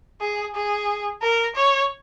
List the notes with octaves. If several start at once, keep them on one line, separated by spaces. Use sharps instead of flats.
G#4
G#4
A#4
C#5